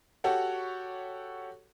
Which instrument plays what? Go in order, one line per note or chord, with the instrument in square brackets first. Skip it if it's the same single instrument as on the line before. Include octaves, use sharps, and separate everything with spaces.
[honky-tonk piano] F#4 G4 A4 C#5 F#5